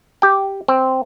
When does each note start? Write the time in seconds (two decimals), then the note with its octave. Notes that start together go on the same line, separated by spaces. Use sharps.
0.22 G4 G5
0.68 C4